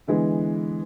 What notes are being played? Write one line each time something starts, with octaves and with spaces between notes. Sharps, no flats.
D3 E3 G#3 B3